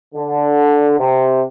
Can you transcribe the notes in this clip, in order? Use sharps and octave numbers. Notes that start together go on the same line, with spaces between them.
D3
C3